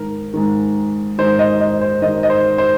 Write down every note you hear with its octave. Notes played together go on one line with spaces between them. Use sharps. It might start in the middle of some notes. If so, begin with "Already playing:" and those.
Already playing: G#2 D#3 A#4
G#2 D#3
G#2 D#3 C5
D#5
D#5
C5
G#2 D#3 D#5
D#5
C5
C5